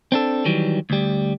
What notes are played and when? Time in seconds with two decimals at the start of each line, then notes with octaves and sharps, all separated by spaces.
0.12 C4 D4 A4
0.45 D#3 E3 F#3 G3
0.90 D2 G3